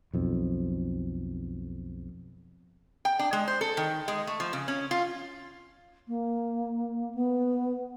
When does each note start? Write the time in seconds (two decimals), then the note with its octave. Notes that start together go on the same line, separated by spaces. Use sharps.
0.13 B1 F2
3.05 G5
3.19 D4
3.33 G#3
3.48 C5
3.61 A4
3.77 D#3
4.08 G#3
4.27 A3
4.40 F3
4.53 C#3
4.68 C#4
4.91 F4
6.08 A#3
7.14 B3